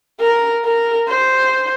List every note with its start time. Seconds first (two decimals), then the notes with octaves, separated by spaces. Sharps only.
0.20 A#4
0.65 A#4
1.09 C5